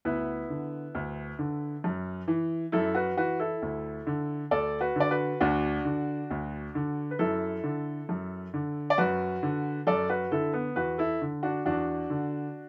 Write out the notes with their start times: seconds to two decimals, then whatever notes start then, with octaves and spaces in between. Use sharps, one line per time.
0.05 D2 B3 E4
0.49 D3
0.95 D2
1.39 D3
1.84 F#2
2.28 E3
2.72 F#2 E4 A4
2.95 F#4 B4
3.17 E3 F#4 B4
3.39 E4 A4
3.62 D2
4.07 D3
4.51 D2 A4 D5
4.81 F#4 B4
4.96 D3 D5
5.11 F#4 B4
5.40 D2 D4 F#4
5.85 D3
6.30 D2
6.75 D3
7.11 B4
7.19 F#2 E4 A4
7.64 D3
8.09 F#2
8.54 D3
8.90 D5
8.98 F#2 F#4 B4
9.43 D3
9.87 F#2 A4 D5
10.10 F#4 B4
10.31 D3 E4 A4
10.53 B3
10.76 E2 F#4 B4
10.98 E4 A4
11.21 D3
11.43 D4 F#4
11.66 E2 D4 F#4
12.10 D3